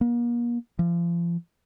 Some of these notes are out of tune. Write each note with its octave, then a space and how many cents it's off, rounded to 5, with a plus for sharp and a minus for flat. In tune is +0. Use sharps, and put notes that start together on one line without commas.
A#3 +40
F3 -35